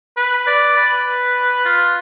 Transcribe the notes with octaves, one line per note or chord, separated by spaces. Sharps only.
B4
D5
B4
F4